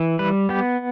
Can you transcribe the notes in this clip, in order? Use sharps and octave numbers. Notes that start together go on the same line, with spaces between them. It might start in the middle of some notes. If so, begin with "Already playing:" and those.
Already playing: E3
G3 B4
B3 G4